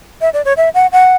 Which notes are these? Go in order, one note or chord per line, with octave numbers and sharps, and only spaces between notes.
E5
D5
C#5
E5
F#5
F#5